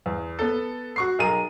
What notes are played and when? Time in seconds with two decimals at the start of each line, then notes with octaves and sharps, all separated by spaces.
0.06 E2
0.39 B3 A4
0.96 F#4 C#6 C7
1.19 B1 G#4 A#4 D#7